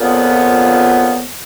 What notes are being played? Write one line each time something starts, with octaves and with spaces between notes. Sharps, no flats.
F2 A#2 C#3 B3